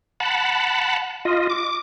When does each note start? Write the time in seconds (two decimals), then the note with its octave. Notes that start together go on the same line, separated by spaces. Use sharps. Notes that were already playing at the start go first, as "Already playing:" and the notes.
0.20 F#5 A5 B5
1.25 F4 D#5
1.50 D6